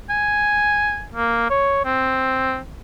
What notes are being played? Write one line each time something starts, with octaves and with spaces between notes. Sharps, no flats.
G#5
A#3
C#5
C4